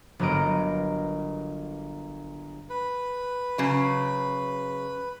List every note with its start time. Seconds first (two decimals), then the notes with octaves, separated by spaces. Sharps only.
0.19 G1 F#3 B3 A#4 D#5 D7
2.70 B4
3.58 C#3 F#3